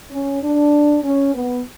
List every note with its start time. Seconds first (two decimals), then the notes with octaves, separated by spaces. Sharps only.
0.11 C#4
0.42 D4
1.03 C#4
1.34 B3